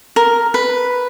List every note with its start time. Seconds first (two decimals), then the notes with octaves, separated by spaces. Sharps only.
0.16 A#4
0.54 B4